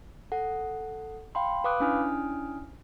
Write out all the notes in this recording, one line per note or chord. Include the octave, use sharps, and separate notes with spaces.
A4 F#5
F5 G5 B5 C6
B4 F5 B5 D6 D#6 F#6
C#4 D4 E4 G#5 D#6 F6